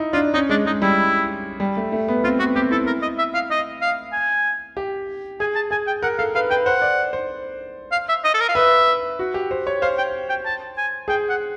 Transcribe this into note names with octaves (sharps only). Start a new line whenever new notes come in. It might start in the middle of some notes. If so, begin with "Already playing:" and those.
Already playing: D#4 E4
D4 F4
C#4 D#4
G#3 D4
G#3 D#4
G3 E4
G3
A3
A3
B3
C4 F4
B3 F#4
C4 G4
E4 A4
A#4
D#5
E5
F5
D#5
F5
G#5
G4
G#4 G#5
A5
G#4 G#5
G5
A#4 F#5
A4 F5
B4 F5
B4 G5
C5 F#5
D5
C5
F5
E5
D#5
A4
A#4
F5
B4 E5
F#4
G4
C5
C#5
C5 F5
G5
G5
A5
G#5
G#4 G5
F#5